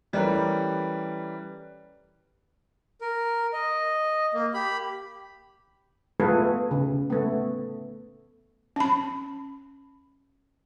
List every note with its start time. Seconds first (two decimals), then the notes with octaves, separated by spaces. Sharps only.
0.13 E3 G3 A3 C#4 A#4 B4
3.01 A#4
3.53 D#5
4.34 A#3
4.54 G4 B5
6.20 A3 B3 F4 G#4 A4 B4
6.71 C#3
7.10 A3 B3
8.76 C#4 B5